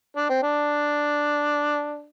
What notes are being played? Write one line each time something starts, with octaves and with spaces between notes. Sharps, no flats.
D4
C4
D4